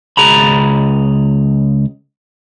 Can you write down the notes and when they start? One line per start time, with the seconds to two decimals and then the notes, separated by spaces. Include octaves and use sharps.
0.17 C#2 G#4 A#5 B5